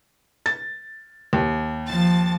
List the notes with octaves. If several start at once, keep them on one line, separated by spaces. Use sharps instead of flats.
A6
D#2
F3 A5 A6